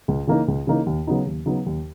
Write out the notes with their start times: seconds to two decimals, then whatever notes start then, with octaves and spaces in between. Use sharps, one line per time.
0.08 C#2
0.27 C#3 E3 A#3 D#4
0.48 C#2
0.67 C#3 E3 A#3 D#4
0.86 D#2
1.07 C#3 F#3 B3 D#4
1.26 D#2
1.46 C#3 F#3 B3 D#4
1.66 D#2